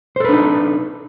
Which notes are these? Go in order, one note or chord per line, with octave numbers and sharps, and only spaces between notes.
D4 D#4 A4 B4 C5